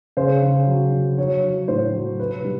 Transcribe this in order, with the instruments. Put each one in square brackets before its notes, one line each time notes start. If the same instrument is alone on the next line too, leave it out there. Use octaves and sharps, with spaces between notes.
[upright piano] C#3 C5
C#3
F#3
F#3
F#3 C#5
F#3
A2 C5
F#3
C3 B4
G3